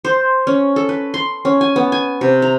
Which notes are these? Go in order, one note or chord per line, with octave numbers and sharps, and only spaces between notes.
C5
C#4
A4
B4
C6
C#4
G#5
B3
G#5
C3
A#5